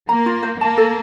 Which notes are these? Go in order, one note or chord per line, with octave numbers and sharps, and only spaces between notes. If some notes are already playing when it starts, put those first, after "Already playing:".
A#3 A#5
F4
C5
A#3 A5
A4